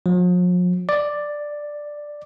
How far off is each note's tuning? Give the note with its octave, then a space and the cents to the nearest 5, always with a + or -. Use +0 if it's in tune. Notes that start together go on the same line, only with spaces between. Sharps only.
F3 +45
D5 +5